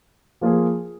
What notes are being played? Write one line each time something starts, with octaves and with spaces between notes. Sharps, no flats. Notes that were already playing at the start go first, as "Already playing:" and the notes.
F3 A#3 F4 G#4